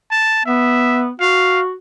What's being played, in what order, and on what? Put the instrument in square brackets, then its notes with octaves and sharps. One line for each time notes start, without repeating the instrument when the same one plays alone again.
[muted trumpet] A5
[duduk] B3 [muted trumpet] E5
[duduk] F#4 [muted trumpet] F5